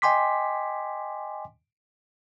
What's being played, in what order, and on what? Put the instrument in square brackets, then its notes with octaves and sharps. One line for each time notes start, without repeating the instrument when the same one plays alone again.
[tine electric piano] D#5 G5 G#5 C6 D6 B6